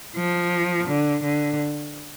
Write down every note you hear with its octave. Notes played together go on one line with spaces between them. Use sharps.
F3
D3
D3